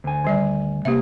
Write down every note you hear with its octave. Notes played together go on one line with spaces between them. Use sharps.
D2 G#5
D#3 G3 D5
C3 A#3 G4 E5